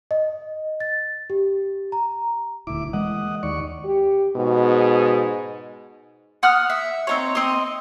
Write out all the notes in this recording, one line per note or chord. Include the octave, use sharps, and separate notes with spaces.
D#5
A6
G4
A#5
D#1 D2 E4 D6
E3 G#3 A#3 D#5 F#5
D#2 D5 C#6
G4
G#2 B2
F#5 D#6 F6 F#6
E5
C4 D#4 C#5
C4 D#5